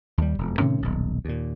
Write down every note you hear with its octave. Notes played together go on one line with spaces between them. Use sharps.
D#2 G3
E1 F2
A2 C3 D#3 C#4
D#1 B1
D#2 A#2